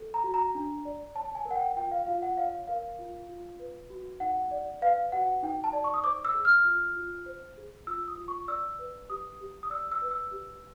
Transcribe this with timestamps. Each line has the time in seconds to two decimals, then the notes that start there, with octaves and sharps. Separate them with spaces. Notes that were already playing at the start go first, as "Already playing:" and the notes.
Already playing: A4
0.14 A#5
0.24 F#4
0.34 A#5
0.55 D4
0.85 D5
1.15 C#5 A5
1.35 G#5
1.45 A#4
1.51 F#5
1.56 G5
1.76 F4 G5
1.91 F5
2.07 F4 F5
2.22 F#5
2.38 C#5 F5
2.68 A#4 F5
2.99 F4
3.29 F4
3.59 B4
3.90 F#4
4.20 D#4 F#5
4.51 D5
4.82 B4 F5
5.12 F#4 F#5
5.43 D#4 G5
5.64 A5
5.73 D5
5.84 C#6
5.94 D#6
6.04 C5 D6
6.25 E6
6.34 G#4
6.45 F6
6.65 F4
6.96 F4
7.26 C5
7.57 G#4
7.87 F4 E6
8.08 D#6
8.18 F4
8.28 C#6
8.48 D5 E6
8.79 B4
9.09 G4 D#6
9.41 G4
9.63 D#6
9.70 D5 E6
9.92 E6
10.02 B4
10.11 E6
10.31 G4